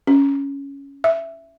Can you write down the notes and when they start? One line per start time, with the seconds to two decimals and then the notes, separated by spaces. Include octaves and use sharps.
0.07 C#4
1.04 E5